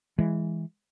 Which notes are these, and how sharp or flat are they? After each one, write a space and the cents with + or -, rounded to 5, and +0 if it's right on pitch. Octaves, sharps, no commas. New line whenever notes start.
E3 +0 G#3 +0